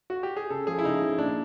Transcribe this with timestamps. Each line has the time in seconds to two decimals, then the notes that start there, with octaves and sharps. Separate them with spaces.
0.10 F#4
0.23 G4
0.37 G#4
0.50 C#3 A4
0.67 F3 G#4
0.78 E4
0.84 C#3 D#4
1.01 F3
1.18 A#2 D4